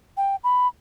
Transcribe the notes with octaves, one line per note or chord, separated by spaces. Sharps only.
G5
B5